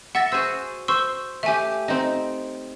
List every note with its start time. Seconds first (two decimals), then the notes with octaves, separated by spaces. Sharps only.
0.15 E5 F#5 A6 A#6
0.32 F#4 G#4 C5 E6
0.88 C5 C6 C#6 E6
1.43 A3 G4 E5 G#5
1.88 C4 D#4